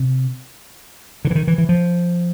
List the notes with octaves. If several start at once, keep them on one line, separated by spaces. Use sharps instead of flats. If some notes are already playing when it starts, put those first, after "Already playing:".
Already playing: C3
D3
E3
D#3
E3
E3
F3